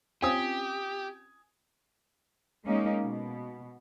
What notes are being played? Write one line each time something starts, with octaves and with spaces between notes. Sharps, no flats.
C4 C#4 F4 G4 G#5 D#6
G#3 A#3 C#4 D#4
B2